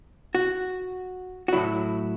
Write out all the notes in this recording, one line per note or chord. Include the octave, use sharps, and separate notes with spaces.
F#4
F#4
A2 F#3 E4